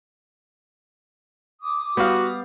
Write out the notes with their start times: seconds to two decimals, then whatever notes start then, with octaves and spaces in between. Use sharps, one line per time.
1.62 D6 D#6
1.97 G3 B3 F#4 F5